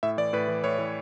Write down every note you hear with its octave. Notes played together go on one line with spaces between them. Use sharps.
A2 E5
E3 D5
A2 B4
E3
A2 C#5
E3